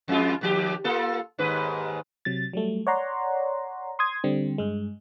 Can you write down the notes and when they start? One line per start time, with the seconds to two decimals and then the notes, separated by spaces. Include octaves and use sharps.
0.08 F2 G#3 F4
0.41 D#2 F3 G4
0.84 A#3 F4 A4
1.39 D#2 G#2 B4
2.25 C3 F#3 A6
2.53 F#3 G3 A3
2.87 C#5 D5 F#5 A#5 C6
3.99 C6 D#6 G#6
4.24 D3 G3 C4
4.58 G2 G#3